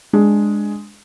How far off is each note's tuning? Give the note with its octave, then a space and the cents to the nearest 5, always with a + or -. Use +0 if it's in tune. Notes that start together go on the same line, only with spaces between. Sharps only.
G#3 +0 D4 +5